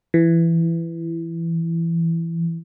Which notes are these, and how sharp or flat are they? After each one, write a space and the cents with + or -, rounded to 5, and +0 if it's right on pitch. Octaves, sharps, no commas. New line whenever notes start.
E3 +15